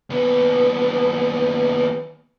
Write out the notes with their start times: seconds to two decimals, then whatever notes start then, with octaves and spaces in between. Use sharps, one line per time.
0.10 D#2 B3